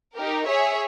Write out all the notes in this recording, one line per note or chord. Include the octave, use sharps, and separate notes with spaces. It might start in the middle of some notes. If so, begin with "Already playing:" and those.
D#4 G4 A#4
G#4 C#5 E5